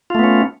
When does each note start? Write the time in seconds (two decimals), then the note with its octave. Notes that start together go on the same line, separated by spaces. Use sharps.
0.10 F4
0.15 A3
0.19 B3
0.24 C#4